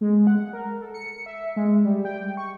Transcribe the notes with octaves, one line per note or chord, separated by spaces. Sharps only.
G#3
F#5
A#4
A4
C#7
E5
G#3
G3
G5
C#6